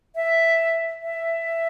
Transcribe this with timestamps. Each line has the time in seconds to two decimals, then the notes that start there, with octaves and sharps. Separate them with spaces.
0.15 E5
1.02 E5